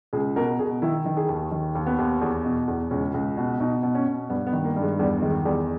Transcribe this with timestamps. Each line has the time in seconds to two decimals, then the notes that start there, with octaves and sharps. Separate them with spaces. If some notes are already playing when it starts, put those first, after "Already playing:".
0.13 C#2 G#4
0.36 B2 A#4
0.59 B2 G#4
0.82 D#3 E4
1.06 D#3
1.17 G#4
1.29 D#2
1.52 D#3
1.75 D#2
1.86 B3
1.99 D#2
2.21 E2
2.45 B2
2.68 E2
2.91 C#2 C#4
3.14 C#2
3.37 B2
3.60 B2 D#4
3.83 B2
3.95 C#4
4.07 B2
4.29 G2 B3
4.47 B3
4.53 D#3
4.64 A#3
4.76 G2
4.82 G#3
4.99 E2 G3
5.22 D#3 G#3
5.45 E2 G3